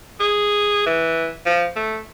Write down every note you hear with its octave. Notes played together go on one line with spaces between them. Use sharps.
G#4
E3
F3
A3